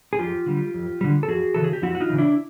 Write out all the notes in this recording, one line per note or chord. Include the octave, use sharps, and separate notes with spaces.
G#4
F2 F4 G4
D3 G3
F2
D3 G3
A4
F2 F#4 G#4
C#3 E3 A4
G#4
G4
F2 E4 F#4
F#4
D#4 F4
C#3 E3
D4 E4